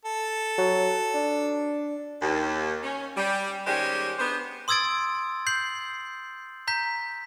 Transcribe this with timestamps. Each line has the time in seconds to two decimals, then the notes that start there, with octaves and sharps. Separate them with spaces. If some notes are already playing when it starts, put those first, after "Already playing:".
0.05 A4
0.58 F#3
1.14 D4
2.22 D#2
2.83 C#4
3.17 G3
3.67 D#3 G3 G#3 C#4 G4 C5
4.19 B3 D4 C5
4.68 C6 D#6 E6 G#6 A6 D7
5.47 G6 C7 F#7
6.68 A#5 G6 B6